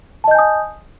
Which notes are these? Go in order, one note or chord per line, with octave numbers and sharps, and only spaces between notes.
D#5 G#5 A5 D#6 G6